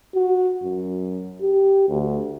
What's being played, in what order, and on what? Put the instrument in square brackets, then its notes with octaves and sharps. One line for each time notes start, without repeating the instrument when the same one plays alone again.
[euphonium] F#4
F#2
G4
D2